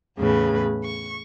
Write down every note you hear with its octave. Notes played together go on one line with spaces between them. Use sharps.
E2 A2 C#3 B4
C#6